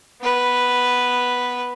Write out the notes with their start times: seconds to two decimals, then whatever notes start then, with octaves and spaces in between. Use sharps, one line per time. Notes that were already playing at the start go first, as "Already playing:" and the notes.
0.21 B3 B4